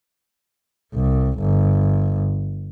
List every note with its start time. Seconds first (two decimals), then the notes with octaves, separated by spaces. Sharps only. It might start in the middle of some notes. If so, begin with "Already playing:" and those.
0.94 C2
1.40 G1